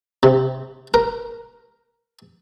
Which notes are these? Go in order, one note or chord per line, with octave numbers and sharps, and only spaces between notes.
C3
A#4